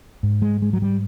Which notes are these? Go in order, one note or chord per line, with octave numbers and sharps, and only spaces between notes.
G#2
G#3
G#3
F#3
G3